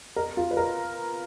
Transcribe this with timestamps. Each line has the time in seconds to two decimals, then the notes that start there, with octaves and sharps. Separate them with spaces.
0.16 A#4
0.37 F4
0.51 B4
0.57 A#4